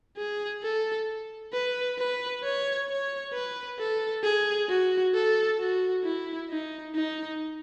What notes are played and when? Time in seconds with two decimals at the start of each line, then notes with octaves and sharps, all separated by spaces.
0.17 G#4
0.63 A4
1.53 B4
1.98 B4
2.43 C#5
2.89 C#5
3.34 B4
3.79 A4
4.24 G#4
4.69 F#4
5.14 A4
5.60 F#4
6.05 E4
6.50 D#4
6.95 D#4